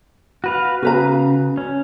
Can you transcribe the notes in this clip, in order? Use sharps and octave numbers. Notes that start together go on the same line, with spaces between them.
F#4 B4 F5
C#3 F#4 B4 A#5
C#4